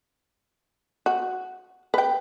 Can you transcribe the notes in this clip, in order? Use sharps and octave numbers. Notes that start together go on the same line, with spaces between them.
F#4
B4 G5